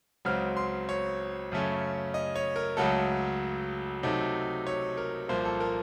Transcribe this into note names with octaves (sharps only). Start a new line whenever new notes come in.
C#2 C#3 F#3 C4 F6
C6
C#5
F#2 C#3 A3 C#4
D#5
C#5
A#4
C#2 C#3 F#3 A3 A4
C3 F#3 A3 D#4
C#5
A#4
C2 A#2 F3 A#3 C5
A4
A#4